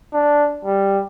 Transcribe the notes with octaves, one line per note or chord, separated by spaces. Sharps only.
D4
G3